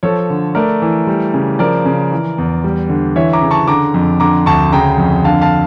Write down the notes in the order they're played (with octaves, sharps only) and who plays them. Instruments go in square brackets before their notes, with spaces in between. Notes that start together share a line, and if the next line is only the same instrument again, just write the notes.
[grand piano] F3 A4 C#5
D3
A3 A#4 D5
E3
G3
C#3
F3 A#4 D5
C#3
E3
E2
G3
D3
E3 C#5 E5
A#5 D6
C#3
A5 C#6
D3 A#5 D6
F2
D3 A#5 D6
D2 A5 C#6
C#3 G5 A#5
F2
D3 F5 A5
F5 A5